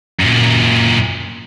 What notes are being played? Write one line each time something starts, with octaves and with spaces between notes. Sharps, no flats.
F#2 A#2